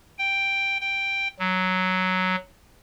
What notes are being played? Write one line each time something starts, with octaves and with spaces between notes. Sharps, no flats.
G5
G5
F#3